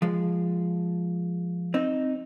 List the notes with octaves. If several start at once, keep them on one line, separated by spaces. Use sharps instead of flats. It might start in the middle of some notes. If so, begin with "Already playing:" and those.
F3 G#3
C4 D#4